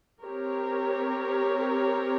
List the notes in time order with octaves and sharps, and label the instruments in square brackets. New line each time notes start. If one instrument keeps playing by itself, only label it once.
[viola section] C4 G4 A#4 C#5